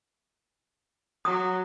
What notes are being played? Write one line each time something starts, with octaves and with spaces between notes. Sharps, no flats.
F#3 D#6